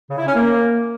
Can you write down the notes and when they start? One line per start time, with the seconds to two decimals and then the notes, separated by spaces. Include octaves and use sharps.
0.10 C#3
0.18 E4
0.27 C#4
0.35 A#3